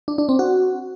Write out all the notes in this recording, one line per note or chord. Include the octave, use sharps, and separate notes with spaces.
D4
D4
C4
F#4